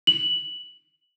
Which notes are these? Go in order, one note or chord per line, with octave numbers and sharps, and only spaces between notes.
F#7